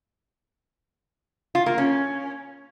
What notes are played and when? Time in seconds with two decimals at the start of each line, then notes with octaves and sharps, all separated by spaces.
1.55 F4
1.66 A#3
1.78 C#4